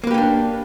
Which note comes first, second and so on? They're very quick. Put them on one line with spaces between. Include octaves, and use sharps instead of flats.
A#3 B4 G4 C#4 D4